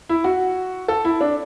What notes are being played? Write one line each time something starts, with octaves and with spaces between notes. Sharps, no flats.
E4
F#4
A4
E4
D4